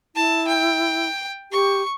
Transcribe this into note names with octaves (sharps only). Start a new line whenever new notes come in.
E4 A5
G5
G4 C#6